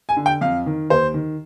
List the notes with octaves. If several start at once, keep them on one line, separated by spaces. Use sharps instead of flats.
G#5
D3
G5
F2 F5
D#3
D#2 C5
D#3